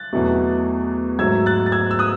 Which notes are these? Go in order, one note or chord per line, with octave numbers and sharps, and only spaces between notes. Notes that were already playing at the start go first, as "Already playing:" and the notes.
Already playing: F#6 A6
E2 B2 F#3 A3
G#2 F#3 A3 E6 G#6
F#6 A6
A6
E6 G#6
E6
D#6 F#6